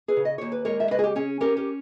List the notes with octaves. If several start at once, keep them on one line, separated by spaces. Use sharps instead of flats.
G#4 B4
C#3
D#5
D#2 C#5
B4
G#3 A#4 C#5
E5
C#3 B4 D#5
G#4
G4
C#4 G#4
C#4 G4 A#4
G4 A#4